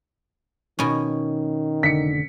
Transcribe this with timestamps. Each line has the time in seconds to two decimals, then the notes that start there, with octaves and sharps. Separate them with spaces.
0.79 B2 D#3 C#4
1.83 F1 D3 B6 C#7